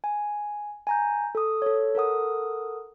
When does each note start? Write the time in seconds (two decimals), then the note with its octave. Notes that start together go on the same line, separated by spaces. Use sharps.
0.04 G#5
0.87 G#5 A#5 G6
1.35 A4 D#6
1.62 A4 C#5
1.95 A4 A#4 F#5 D#6